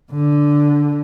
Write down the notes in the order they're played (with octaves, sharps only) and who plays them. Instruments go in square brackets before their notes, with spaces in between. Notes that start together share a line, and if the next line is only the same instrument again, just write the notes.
[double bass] D3